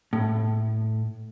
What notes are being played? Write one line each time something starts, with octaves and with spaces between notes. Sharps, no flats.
A2